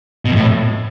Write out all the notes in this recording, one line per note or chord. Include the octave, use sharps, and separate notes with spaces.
B2
F2
A2